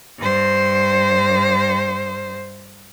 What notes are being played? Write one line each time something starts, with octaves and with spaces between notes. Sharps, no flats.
G2 C5